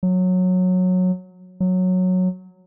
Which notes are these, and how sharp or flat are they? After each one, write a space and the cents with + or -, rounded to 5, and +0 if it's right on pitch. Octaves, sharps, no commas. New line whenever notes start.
F#3 -15
F#3 -10